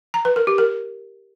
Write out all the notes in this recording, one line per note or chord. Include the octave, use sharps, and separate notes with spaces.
A#5
B4
A#4
G4
A#4